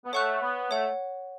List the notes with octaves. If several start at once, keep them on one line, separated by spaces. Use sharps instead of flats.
B3
A3 C#5 F#5 C#6 F#6
B3
A3 C#5 F#5